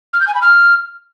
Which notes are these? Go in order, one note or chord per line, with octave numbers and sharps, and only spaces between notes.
F6
G6
G#5
B5
F6